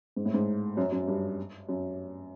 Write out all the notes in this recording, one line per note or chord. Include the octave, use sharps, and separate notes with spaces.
G#2
A2
G#2
F#2
F#2
G2
F#2